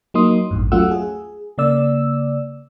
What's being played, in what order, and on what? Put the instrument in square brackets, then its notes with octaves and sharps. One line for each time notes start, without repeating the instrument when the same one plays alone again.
[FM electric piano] F#3 A#3 D#4 C6 D#6
A1 E2 G2
F#3 A3 C#4 F4 F#5 E6
G#4
C#3 A#3 D5 E6